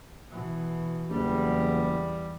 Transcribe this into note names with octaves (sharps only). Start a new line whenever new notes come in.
B2 E3
F#1 E2 G3